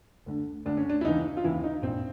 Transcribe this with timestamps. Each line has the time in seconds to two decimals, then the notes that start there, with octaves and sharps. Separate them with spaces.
0.26 D2 D3
0.66 D2 D3 D4
0.77 C#4
0.89 D4
1.01 E4
1.05 D#2 C#3 E3 D#4
1.37 F4
1.44 D#2 C#3 E3 E4
1.64 D#4
1.82 A#1 A#2 C4